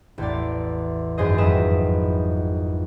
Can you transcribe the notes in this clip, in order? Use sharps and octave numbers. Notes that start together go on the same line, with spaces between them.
A1 E2 D5
G#1 F#2 G#4 C5 D#5
F2 F#3 E4 B4 D#5 E7